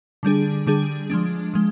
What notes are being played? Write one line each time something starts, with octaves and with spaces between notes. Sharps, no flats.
D3 G3 D4 G#4
D3 G3 D4 G#4
F3 G#3 D4
F3 G#3